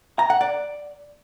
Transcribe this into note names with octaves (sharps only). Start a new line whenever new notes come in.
A#5
F#5
D5